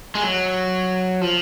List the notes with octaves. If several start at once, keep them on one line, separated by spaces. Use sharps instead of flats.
G#3
F#3
F3